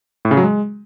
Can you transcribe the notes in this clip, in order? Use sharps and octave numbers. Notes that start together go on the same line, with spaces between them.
A2
C#3
F#3
G#3